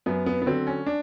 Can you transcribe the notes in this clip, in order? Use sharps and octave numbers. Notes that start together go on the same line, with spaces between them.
F#2 B3
B3
B3
D3 F#3 C4
C#4
D4